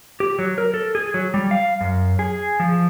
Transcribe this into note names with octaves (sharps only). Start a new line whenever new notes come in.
G4
F#3
A#4
A4
G#4
F#3
G3
F5
F#2
G#4
F3